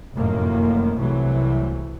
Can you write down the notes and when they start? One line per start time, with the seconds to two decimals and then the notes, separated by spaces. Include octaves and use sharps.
0.15 F1 F#2 A2 D#3 A#3
0.98 C2 C3 E3 F#3 A3